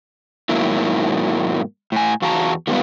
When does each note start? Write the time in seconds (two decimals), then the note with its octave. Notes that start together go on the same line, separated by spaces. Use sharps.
0.49 G#2 B2 D#3 F#3 A#3 E4
1.92 A2 G#5
2.22 E2 F#4 F5 A5 A#5
2.67 D#3 G3 G#3 A#3 B3 F4